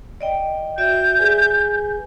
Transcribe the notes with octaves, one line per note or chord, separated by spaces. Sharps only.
D5 D#5 G5
F#4 D5 E5 G6
G#4 B4 G#5